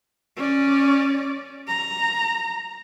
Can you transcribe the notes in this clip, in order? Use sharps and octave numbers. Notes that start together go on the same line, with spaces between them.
C#4 D5
A#5